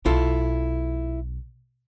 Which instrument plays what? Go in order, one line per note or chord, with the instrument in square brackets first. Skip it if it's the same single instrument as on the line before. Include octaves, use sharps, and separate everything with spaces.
[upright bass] B1 [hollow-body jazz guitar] E4 F4 A4